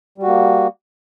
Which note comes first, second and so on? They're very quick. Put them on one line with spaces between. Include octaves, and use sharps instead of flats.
G3 F#4 A#3